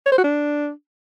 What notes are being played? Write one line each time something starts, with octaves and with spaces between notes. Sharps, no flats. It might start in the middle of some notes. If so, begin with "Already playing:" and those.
C#5
C5
F#4
D4